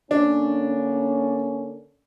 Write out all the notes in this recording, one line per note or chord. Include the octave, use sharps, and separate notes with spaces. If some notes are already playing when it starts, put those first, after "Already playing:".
D3 A#3 C#4 D4